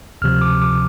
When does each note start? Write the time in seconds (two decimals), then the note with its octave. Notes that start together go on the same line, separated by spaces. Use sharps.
0.22 D2 C3 F3 F6
0.41 D6
0.62 D6